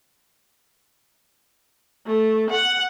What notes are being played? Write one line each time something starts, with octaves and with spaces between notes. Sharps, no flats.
A3
F#5